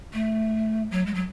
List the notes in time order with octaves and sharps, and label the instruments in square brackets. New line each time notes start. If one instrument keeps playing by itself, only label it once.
[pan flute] A3
F#3
G#3
F#3